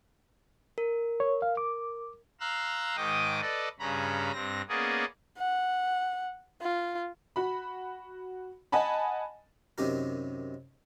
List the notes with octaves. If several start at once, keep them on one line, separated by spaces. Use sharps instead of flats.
A#4
C#5
F5
D6
F5 A#5 C6 E6 F#6
G#2 D#3 D#5 G5 D6 D#6
A4 B4 D5 D#5
G2 C#3 C#4 A#5 B5
G2 C4 A#6
A#3 B3 C#4 G#4 D5 D#5
F#5
F4
F#4 B5
D#5 F#5 G#5 A5 B5
F#2 C3 D#3 G4 A#4